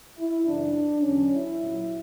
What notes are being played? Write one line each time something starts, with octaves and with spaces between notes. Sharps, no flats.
E4
F#2 C#3 E3 D4
E2 D3 F#3 C#4
E4
A#2 F#3